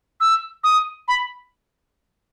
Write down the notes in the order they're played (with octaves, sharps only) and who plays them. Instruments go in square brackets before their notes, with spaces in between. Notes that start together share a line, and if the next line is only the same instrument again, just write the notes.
[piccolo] E6
D#6
B5